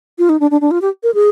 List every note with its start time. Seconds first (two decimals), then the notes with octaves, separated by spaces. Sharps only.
0.18 F4
0.29 D#4
0.40 D4
0.51 D4
0.61 D4
0.71 F4
0.82 G4
1.03 A#4
1.14 G#4